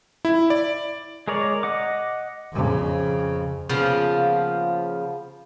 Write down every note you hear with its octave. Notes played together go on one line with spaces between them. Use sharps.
E4
D5
G#3 G#4 A#4 C#5 D5
D#5 F#5 D6
F2 C#3
C#3 F3 A#3 B3